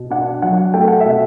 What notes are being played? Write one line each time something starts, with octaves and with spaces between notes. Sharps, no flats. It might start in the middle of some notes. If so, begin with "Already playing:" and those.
Already playing: B2
D4 F#5
F#3 F#5
A3 G5
F#5
B2 E5